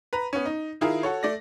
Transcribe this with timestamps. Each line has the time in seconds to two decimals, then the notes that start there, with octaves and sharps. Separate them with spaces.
0.13 B4 A#5
0.33 B3 C#4
0.46 D#4
0.81 D#3 E4 F4 G#4 A#4
1.03 F#4 A4 C#5
1.23 A3 D5 A#6